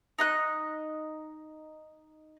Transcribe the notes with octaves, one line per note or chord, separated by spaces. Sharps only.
D#4 D#5 F#6